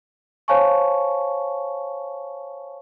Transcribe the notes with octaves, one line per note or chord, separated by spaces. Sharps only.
C5 C#5 F5 G#5 A5 C#6